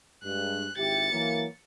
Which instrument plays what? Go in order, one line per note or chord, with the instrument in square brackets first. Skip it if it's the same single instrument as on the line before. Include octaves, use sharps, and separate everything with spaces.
[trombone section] G2 G#3 [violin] F#6
[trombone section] G#1 E4 G4 [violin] A6 C#7
[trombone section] E3 F#3 A#3